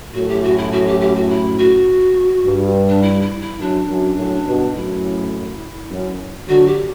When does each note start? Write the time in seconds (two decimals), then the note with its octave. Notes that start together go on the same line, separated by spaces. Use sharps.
0.14 F#2 A2 F#4
0.28 G4
0.43 F#4
0.58 E4
0.72 F#4
0.87 G4
1.00 G4
1.16 F#4
1.30 E4
1.58 F#4
2.45 G2
2.89 D4
3.02 E4
3.22 E4
3.41 E4
3.60 F#2 D4
3.89 F#2
4.17 F#2 A2
4.46 G2 B2
4.75 F#2 A2 E4
5.91 F#2
6.48 D3 F#3 F#4
6.67 G4